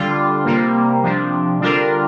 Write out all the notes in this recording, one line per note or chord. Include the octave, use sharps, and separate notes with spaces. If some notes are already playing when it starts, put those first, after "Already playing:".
Already playing: D3 G3 D4 F4
C3 G3 A#3
C3 F3 D4
D3 G3 D4 F4 A#4